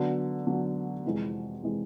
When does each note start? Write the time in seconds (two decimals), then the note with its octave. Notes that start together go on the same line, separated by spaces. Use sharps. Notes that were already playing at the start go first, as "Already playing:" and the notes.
Already playing: D3 F#3 B3
0.47 D3 F#3 B3
1.04 F2 C3 E3 G#3
1.63 C3 E3 G#3